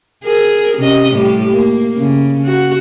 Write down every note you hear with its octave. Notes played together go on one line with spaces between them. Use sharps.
G#4 A#4
C3 C#4 D#5
A2 G3 G4
A#3
C#3
F#4